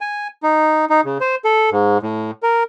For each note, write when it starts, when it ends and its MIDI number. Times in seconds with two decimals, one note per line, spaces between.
0.01 0.28 80
0.43 0.85 63
0.90 1.01 63
1.05 1.18 49
1.21 1.35 72
1.44 1.70 69
1.72 1.98 44
2.03 2.31 45
2.43 2.63 70